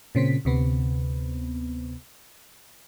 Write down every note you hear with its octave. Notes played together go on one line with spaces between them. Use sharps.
A#2 C#3 C4 B6
D2 C3 B3